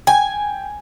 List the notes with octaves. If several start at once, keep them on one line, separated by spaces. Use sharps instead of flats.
G5 G#5